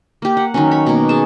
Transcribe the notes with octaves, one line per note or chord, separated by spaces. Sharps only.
A#3 G4
F#5
D#3 F#3 C#4
C#5 B5
B2 A#3
G#4 A5